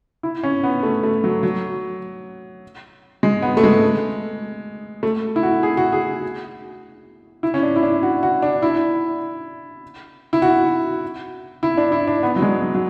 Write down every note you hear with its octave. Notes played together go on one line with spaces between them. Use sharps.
E4
C#4
B3
A3
A3
F#3
F#3
G#3
B3
A3
G#3
A3
E4
F#4
G#4
F#4
G#4
E4
C#4
D4
E4
D4
F#4
F#4
D4
E4
E4
F#4
E4
D4
E4
D4
B3
F#3
G#3
F#3
F#3